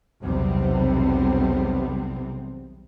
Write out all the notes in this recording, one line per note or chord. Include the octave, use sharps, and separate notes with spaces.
B1 E2 C3 G3 B3 C4